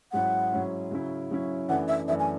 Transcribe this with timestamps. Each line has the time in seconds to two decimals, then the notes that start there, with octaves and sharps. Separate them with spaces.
0.12 G#2 F#3 C#4 E4 F#5
0.52 G#2 F#3 C#4 E4
0.91 C#3 F#3 C#4 E4
1.31 C#3 F#3 C#4 E4
1.69 F#2 E3 A3 D4 F#5
1.88 E5
2.08 F#2 E3 A3 D4 E5
2.20 G#5